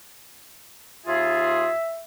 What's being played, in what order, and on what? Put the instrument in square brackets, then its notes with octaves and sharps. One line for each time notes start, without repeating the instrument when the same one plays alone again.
[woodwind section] D#2 F4 G#4 [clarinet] E5